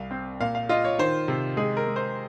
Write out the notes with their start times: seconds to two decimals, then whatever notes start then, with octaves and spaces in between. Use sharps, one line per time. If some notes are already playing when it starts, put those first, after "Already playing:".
Already playing: C2 F5
0.11 C4
0.40 A#2 F5
0.55 F5
0.69 F4 D#5
0.85 C#5
0.99 D#3 C5
1.28 C3
1.57 G#3 G#4
1.77 A#4
1.87 G#3
1.96 C5